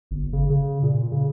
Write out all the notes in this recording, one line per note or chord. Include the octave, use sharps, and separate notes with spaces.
G1
C#3
C#3
A#2
C#3